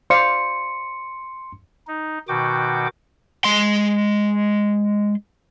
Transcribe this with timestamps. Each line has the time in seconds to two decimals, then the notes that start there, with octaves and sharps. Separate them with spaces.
0.10 C5 D5 F5 C6 C#7
1.88 D#4
2.28 B2 D#3 F#4 G5 D6
3.44 G#3 C6